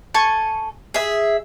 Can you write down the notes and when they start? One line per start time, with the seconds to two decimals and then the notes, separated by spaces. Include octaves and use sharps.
0.14 A4 G#5 C#6
0.94 G#4 E5